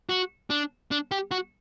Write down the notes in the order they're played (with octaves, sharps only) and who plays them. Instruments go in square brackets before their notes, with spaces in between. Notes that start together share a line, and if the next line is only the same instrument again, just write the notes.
[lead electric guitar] F#4
D4
D4
G4
F#4